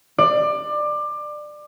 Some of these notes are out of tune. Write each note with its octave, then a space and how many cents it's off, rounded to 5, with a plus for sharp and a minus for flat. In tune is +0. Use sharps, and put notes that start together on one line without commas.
D5 +20